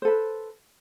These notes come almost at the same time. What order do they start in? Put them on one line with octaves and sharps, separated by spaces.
C5 A4 B4